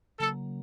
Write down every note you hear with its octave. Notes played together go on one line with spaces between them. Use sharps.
C#3 F#3 A#3 A4